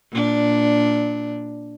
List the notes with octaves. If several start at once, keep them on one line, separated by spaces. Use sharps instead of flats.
A#2 D4